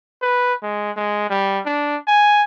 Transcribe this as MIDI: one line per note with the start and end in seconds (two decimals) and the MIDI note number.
0.22 0.54 71
0.63 0.91 56
0.97 1.29 56
1.30 1.60 55
1.66 1.97 62
2.08 2.43 80